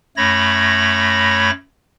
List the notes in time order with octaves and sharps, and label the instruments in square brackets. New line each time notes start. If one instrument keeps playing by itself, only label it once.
[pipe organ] F#2 A3 C#5 B5 A#6